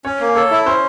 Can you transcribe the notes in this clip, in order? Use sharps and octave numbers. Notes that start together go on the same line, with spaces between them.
C#4 C#5
A#3
A4 C#5
E4
C#4 C5